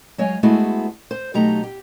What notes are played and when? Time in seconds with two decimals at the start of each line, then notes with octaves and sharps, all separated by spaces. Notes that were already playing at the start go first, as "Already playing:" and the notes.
0.18 F#3 G#3 C#5 D#5 F5 G#5
0.43 G#3 A3 B3 E4 F#4 G#4
1.11 C5
1.34 B2 F#3 A3 D#4 G4 A#5
1.64 G4